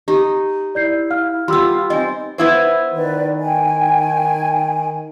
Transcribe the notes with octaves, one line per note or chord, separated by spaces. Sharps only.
D#4 G4
E4 D5 G6 C7
F5 F6
G3 B3 F4 C6 D6 E6
C4 D#4 D#5 G#5
B3 E4 C5
D#3 B4 D5
G5 G#5